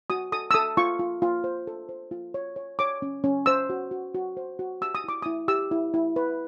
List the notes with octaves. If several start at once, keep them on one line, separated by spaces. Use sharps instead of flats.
F#4 D#6
A4 D#6
E6
A4 D#6
F4 C#6
F4
F4
C5
A4
C5
F4
C#5
C#5
C#5 D6
C#4
C#4
C5 E6
F#4
F#4
F#4
C5
F#4
G4 E6
D#6
E4 D6
E4 D#6
G4 E6
E4
E4
B4